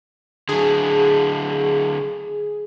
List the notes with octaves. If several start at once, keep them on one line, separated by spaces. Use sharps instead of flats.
D3 F#3 G#4